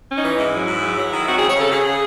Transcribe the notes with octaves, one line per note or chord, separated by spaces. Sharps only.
C#4
D#4
E3
G#2 E4
F#3
G#2
F#3
F#3
D#3
C4 F#4
C#3 G#4
C#5
C#3 A4
C#3 G#4
C#3